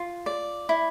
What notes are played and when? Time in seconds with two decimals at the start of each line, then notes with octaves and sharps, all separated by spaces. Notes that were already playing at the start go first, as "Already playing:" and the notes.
Already playing: F4
0.26 D5
0.69 E4